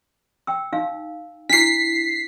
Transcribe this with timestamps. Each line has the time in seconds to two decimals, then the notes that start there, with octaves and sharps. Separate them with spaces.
0.47 G5 E6
0.73 D#4 F5
1.49 D4 E4 B6 C7